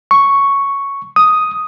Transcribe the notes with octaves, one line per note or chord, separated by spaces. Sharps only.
C#6
D#6